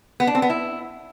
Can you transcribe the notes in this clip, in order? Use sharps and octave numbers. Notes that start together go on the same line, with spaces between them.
B3
D4
C4
B3
E4